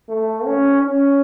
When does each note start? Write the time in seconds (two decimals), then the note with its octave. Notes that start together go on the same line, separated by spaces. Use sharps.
0.09 A3
0.45 C#4
0.82 C#4